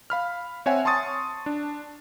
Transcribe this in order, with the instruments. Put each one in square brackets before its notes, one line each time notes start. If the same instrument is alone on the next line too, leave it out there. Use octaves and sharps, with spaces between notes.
[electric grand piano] F5 B5 F6
C4 C#5 E5 F#5 G#5
A5 C6 C#6 D#6 A6
D4